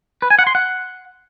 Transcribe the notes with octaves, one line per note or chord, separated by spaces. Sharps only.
B4
G#5
F#5
C6
F#5